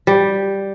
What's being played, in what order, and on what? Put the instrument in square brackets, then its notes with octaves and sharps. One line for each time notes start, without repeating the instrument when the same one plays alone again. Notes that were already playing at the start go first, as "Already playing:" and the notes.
[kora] G3